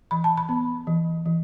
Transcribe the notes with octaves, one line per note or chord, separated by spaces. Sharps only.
E3 B5
A5
B5
B3
E3
E3